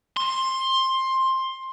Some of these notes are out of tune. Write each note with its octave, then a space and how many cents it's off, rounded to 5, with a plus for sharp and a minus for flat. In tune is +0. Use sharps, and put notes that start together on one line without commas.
C6 +15